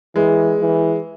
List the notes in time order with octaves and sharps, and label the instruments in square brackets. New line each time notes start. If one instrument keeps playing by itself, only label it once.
[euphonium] E3 [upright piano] G#3
[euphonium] E3